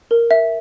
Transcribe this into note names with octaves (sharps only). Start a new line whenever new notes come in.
A#4
E5